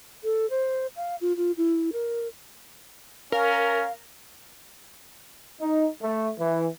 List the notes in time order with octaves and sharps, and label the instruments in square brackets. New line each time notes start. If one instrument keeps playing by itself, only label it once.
[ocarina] A4
C5
F5
F4
F4
E4
A#4
[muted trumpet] C#4 [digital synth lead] A#4 [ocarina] F5
[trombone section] D#4
A3
E3